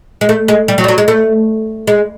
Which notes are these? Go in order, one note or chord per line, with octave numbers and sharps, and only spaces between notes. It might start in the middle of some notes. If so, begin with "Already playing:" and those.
G#3
A3
G#3
G3
F#3
G3
F#3
G#3
A3
G#3